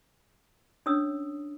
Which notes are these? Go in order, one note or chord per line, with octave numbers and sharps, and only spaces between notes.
C#4 D4 C#5 D#6 E6